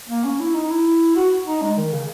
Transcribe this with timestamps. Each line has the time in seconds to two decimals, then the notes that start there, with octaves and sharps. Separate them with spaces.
0.09 A#3
0.24 C#4
0.40 E4
0.54 D#4
0.70 E4
1.16 F#4
1.46 D#4
1.62 G#3
1.77 D#3
1.92 C#3